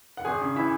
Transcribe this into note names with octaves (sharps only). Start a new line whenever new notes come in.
F#5
G#1 G#4 G#5
C#3
E3 E4 E5